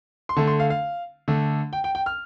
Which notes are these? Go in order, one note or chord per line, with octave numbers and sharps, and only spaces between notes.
C6
D3 A3 A5
C6
F5
F5
D3 A3
G5
G5
G5
F6